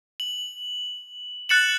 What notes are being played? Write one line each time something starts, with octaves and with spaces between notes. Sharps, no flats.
F#7
F#6 A6 C#7 E7 F#7